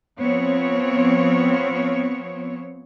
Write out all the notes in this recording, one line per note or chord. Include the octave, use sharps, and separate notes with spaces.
F3 B3 C4 C#5